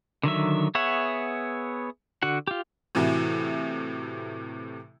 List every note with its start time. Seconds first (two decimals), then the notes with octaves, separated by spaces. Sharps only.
0.23 D3 D#3 F#3 E5
0.75 B3 G#4 C#5 E5 F#5
2.22 D3 F#4 F#5
2.47 F4 G4
2.95 A2 C3 E3 E4 F#4